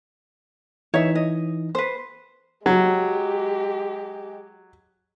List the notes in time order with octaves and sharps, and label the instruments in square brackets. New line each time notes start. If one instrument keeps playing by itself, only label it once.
[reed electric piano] E3 D#4 [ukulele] C#5 E5
[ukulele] D#5
B4 C5
[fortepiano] F#3 [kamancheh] G#3 G4